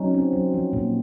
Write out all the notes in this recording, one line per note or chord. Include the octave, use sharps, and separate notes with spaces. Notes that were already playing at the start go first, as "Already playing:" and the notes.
Already playing: F#3 C#4 D#4
C4
F#3
F3
A#2